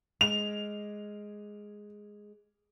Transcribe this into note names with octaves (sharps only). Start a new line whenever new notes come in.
G#3 F7